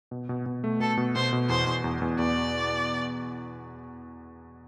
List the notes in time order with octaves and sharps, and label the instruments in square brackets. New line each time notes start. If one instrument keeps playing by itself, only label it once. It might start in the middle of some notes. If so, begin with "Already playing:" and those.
[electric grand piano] B2
B2
B2
A3
[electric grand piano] B2 [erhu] A4
[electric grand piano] B2
[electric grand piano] B2 [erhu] C5
[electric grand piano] B2
[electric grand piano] E2 [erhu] C5
[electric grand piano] E2
E2
E2
[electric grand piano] E2 [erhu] D5